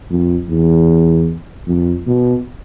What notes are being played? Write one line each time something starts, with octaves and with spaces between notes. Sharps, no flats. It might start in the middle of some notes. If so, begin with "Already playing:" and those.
F2
E2
F2
B2